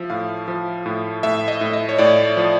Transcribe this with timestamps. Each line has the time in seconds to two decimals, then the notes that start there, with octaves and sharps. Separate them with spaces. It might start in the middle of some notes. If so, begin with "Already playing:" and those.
Already playing: F3 E5
0.10 A2 F5
0.48 F3
0.86 A2
1.23 A2 E5
1.48 D#5
1.61 A2
1.73 D#5
1.89 C#5
1.98 A2 D5
2.37 F3